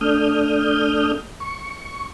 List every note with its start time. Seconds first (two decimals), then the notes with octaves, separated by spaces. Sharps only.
0.01 A3 D4 D#6 F6 G6
1.40 C#6